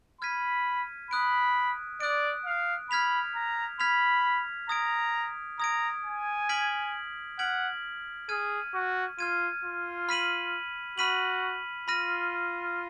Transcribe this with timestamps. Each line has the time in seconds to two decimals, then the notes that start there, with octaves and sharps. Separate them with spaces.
0.21 B5 F6 G#6 B6 D#7
1.11 B5 D#6 F#6 D7
2.00 D5 D#6 F#6 D7
2.46 F5
2.90 B5 F6 G#6 B6 F7
3.35 A#5
3.80 B5 F6 G#6 B6 F7
4.69 A#5 D#6 G#6 D7
5.60 A#5 D#6 G#6 D7
6.05 G#5
6.49 F6 G#6 B6 D7 F#7
7.39 F#5 F6 G#6 B6 D7 F#7
8.29 G#4 F6 G#6 D#7
8.74 F#4
9.19 F4 F6 G#6 D#7
9.64 F4
10.09 B5 F6 B6 D#7 F#7
10.98 F#4 B5 F6 B6 D#7 F#7
11.88 F4 B5 F6 A#6 D#7